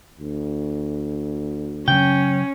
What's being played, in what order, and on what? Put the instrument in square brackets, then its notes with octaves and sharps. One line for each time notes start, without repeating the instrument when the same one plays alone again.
[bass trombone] D2
[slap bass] C#3 F#3 [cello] C#4 [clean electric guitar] G5